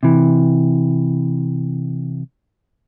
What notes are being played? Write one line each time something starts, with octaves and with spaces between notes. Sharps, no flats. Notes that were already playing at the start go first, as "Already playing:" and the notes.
C3 E3